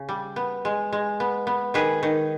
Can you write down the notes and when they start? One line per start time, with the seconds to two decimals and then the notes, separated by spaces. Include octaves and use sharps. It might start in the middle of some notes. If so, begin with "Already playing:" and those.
Already playing: C#3
0.09 G3
0.36 B3
0.65 G#3
0.92 G#3
1.20 B3
1.47 B3
1.74 D#3 G#4 B4
2.03 D#3